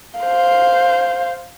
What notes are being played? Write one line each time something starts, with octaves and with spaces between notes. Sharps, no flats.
C5 F5